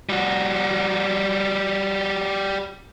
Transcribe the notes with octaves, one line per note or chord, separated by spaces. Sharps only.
G3 F#4